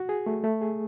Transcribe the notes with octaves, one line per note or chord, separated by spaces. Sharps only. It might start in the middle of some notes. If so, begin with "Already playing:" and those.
Already playing: F#4
G#4
A3
A3
G#4